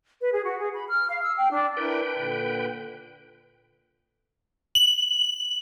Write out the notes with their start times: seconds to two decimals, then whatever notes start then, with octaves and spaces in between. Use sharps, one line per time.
0.21 B4
0.33 G#4
0.45 F#4
0.59 G#4
0.74 B5
0.89 F6
1.09 F5
1.23 E6
1.38 G5
1.51 D4
1.77 D4 E4 A#4 B4 G5
2.16 A#2 D3
4.75 F#7